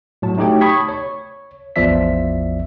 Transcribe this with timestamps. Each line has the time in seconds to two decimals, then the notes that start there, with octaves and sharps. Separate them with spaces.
0.22 A2 F#3 A5
0.37 A3 D#4 F#4 G4 C#5 G5
0.61 A5 B5 C#6 D#6 G#6 B6
0.89 C#5
1.76 A1 E2 F3 D5 E5 B6